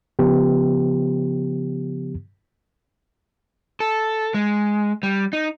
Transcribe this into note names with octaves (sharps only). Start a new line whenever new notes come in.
C#3 F3 B3 G4
A4
G#3
G3
D#4